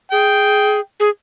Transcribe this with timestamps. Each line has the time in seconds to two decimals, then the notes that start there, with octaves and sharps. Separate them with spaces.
0.11 G#4 G5
1.00 G#4